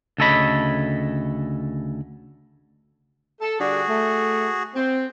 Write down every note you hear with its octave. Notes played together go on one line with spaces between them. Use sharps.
D2 C#3 A4 C#5 D#5 B5
A4
D3 G3 D4 F#4 G#4
A3
C4